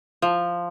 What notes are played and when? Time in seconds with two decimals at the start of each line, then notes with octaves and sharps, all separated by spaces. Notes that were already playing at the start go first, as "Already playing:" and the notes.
0.22 F3